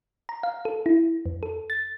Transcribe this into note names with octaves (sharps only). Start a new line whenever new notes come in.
A#5
F5
A4
E4
F2
A4
A6